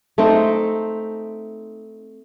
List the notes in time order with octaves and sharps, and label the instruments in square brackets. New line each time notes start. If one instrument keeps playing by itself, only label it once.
[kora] A3 C4 D#4 C5